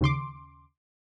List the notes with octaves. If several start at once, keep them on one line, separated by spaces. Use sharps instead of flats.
D#2 C#3 C6 D6